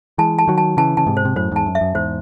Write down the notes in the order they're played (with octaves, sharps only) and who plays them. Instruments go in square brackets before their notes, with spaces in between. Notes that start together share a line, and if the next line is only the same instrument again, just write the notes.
[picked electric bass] E3 G#3 [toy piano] A5
[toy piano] A5
[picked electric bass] D#3 F#3
[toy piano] A5
[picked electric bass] C#3 E3 [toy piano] A5
[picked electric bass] C#3 [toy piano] A5
[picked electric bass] G#2 C3
[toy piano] C5
[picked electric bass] C3
[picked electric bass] F#2 A2 [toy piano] C5
[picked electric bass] E2 G#2 [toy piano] A5
[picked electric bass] F#2
[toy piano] E5
[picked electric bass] F#2
[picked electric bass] E2 G#2 [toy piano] C5